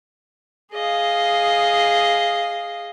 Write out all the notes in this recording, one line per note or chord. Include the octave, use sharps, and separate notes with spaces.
G#4 D#5 F5